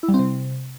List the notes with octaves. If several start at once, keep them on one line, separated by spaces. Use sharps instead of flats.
E4
G3
C4
C3